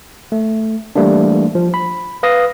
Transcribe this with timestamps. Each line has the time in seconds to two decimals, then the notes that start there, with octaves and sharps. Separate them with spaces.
0.32 A3
0.96 E3 G3 A3 A#3 D4
1.55 F3
1.74 B5
2.23 B4 F5 D#6 A#6